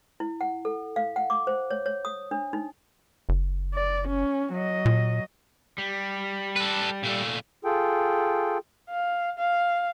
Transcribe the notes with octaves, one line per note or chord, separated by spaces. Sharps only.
E4
F#5
A4
F5
F#5
D6
C5
C#5
C#5
D#6
D4
D#4
F#1
D5
C#4
F#3 D#5
A#2
G3
A4 B4
A#2 A3
F4 G#4 A4 G5
F5
F5